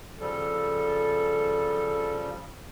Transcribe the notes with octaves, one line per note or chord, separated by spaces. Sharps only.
C#3 F3 G3 A4